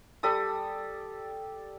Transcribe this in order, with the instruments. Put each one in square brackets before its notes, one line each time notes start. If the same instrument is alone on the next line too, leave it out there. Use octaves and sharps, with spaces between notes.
[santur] G3 A4 D#6